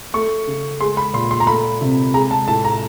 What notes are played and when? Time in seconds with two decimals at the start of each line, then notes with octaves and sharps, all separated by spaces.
0.14 A3 C#6
0.47 C#3
0.81 G#3 C6
0.97 B5
1.14 A#2 C6
1.31 C6
1.40 A#5
1.47 A3 B5
1.81 C3
2.14 G#3 A#5
2.31 A5
2.48 A2 A5
2.64 A#5